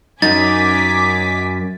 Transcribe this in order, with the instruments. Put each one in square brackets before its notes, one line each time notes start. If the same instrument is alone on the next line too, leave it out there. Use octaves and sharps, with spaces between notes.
[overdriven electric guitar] F#2 [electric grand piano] D#4 [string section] G#5 D6 B6 [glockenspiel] A6